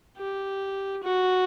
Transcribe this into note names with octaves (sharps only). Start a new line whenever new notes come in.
G4
F#4